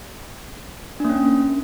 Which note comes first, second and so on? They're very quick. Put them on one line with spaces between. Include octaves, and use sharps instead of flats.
D4 A#3 C#4